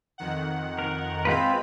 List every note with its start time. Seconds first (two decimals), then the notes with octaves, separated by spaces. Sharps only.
0.18 F2 D#3 F#5
0.79 A#4
1.25 G#3 C4 F4 B4 B5